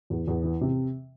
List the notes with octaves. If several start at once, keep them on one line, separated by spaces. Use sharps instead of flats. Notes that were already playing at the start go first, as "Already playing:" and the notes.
E2
E2
E3
C3